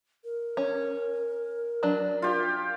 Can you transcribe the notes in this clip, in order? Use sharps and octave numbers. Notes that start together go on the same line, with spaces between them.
A#4
C#4
F#3 D4
F4 G4